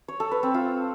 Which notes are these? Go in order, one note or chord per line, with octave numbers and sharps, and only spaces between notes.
C#5
A4
B4
C4
F4